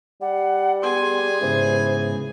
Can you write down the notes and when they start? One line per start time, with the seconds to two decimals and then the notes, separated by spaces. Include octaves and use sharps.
0.21 G3 F#5
0.82 B3 G#4 G#5 C6
1.41 G#2 C#3 E3 B3 C5